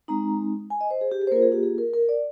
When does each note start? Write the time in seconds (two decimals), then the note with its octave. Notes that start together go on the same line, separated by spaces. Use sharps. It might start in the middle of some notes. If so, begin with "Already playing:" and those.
0.08 G#3 C4 D#4 A#5
0.70 G#5
0.81 D#5
0.91 C5
1.01 G#4
1.11 G4
1.21 G#4
1.27 C5
1.32 A#3 F4 A#4
1.42 G#4
1.52 G4
1.63 G#4
1.78 A#4
1.94 A#4
2.09 D5